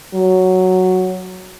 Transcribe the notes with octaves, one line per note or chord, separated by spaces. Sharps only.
F#3